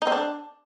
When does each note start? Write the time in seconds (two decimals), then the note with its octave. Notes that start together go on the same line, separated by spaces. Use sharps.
0.02 D#4
0.07 C4
0.12 D4